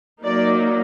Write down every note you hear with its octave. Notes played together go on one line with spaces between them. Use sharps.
F#3 A#3 D#4 D5